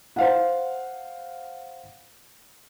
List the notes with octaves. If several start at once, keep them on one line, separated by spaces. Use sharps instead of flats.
C5 F5 F#5